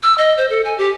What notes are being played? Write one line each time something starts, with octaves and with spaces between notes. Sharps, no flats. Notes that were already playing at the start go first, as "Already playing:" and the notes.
E6
D#5
C5
A4
G#5
G4